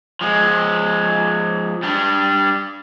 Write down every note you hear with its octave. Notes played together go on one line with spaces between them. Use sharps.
F3 G#3
G3 D4